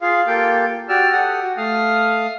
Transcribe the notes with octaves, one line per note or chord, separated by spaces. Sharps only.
F4 G#4 F5
A#3 F4 G4 A4 G5
F#4 G4 D5 E6 F6
G4 A4 F#5 D#6
F#4
A3 F5 D#6 F6